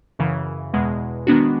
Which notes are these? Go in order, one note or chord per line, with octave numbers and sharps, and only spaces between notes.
F#2 C#3 E3
E2 B2 G#3
D#3 G#3 B3 D4 F#4